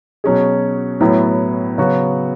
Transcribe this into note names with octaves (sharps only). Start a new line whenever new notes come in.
B2 F#3 C#4 G#4
A2 F#3 B3 E4
C#3 F#3 B3 F#4